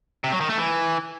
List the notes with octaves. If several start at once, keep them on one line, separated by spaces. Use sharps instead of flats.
C3
F#3
D#3
A3
E3